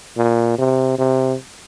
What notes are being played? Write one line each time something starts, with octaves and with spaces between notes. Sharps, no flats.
A#2
C3
C3